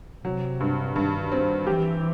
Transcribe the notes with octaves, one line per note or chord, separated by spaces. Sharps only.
C3 F#3
G2
G2 D#3
C4
E3 G4